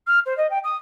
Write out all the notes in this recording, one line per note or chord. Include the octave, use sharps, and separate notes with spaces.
F6
C5
D#5
G5
D#6